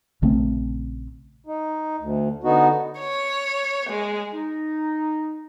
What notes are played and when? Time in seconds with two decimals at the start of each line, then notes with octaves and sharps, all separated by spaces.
0.22 A#1 C#3 A3 C4
1.47 D#4
2.00 D2
2.44 D3 B3 D#4 F#4
2.99 C#5
3.91 G#3
4.33 D#4